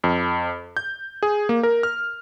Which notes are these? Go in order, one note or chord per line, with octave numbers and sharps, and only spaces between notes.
F2
G6
G#4
A#3
A#4
F6